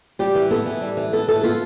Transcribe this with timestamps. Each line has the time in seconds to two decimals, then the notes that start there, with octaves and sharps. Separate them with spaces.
0.19 G3 G4
0.35 E3
0.51 B3 A4
0.66 E3
0.81 G3
0.97 E3
1.13 B3 A4
1.28 E3 A4
1.43 B3 F4